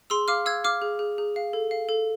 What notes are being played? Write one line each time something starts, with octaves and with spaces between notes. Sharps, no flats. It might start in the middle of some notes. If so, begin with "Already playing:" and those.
G#4 C6 E6
F5 D6 F6
F5 E6 G#6
F5 D6 F6
G#4
G#4
G#4
F5
A4
F5
A4